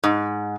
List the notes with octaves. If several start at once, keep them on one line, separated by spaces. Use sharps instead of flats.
G#2